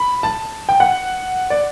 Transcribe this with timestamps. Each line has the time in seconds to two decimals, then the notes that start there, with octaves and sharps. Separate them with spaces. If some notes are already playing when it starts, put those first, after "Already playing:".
Already playing: B5
0.23 A5
0.69 G5
0.80 F#5
1.50 D5